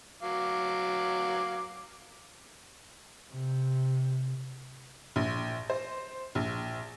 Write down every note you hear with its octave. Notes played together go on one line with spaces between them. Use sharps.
F#3 F5 D6
C3
A#1
C5
A#1